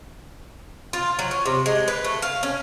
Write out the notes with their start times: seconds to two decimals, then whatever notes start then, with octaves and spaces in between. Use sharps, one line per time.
0.93 F4
1.19 F#3
1.31 C#4
1.46 C3
1.66 G#3
1.88 B4
2.04 A3
2.22 F5
2.43 C#4